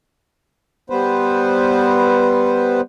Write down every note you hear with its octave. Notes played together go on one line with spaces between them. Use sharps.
G3 B3 B4 C5